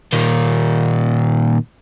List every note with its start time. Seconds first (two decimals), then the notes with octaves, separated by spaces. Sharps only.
0.13 A#2 D#3